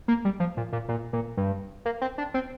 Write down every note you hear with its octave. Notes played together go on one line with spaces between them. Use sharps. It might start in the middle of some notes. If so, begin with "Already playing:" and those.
A#3
G3
F3
A#2
A#2
A#2
A#2
G2
A#3
C4
D4
C4